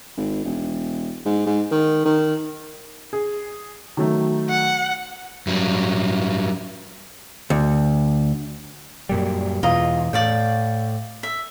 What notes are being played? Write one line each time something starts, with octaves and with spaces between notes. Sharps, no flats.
G#1
E1
G#2
G#2
D#3
D#3
G#4
D#3 F#3 A3
F#5
G2 F#3
D2
F#2 A#2 G3
E2 B2 F4 D#5 A#5
A2 D5 F5 G5
E5